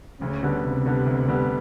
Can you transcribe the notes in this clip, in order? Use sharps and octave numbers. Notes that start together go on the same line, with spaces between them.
D2 C#3
D3 G3 B3
D2 C3
D3 G3 B3
D2
D3 G3 B3